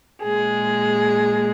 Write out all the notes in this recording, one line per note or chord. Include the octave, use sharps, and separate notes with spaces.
A#2 G#3 G#4